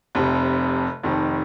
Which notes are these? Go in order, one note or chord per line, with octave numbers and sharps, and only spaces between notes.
F1 F2 C3
F1 F2 D#3